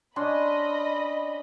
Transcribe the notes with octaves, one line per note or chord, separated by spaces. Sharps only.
C#4 D4 D#5 B5 C6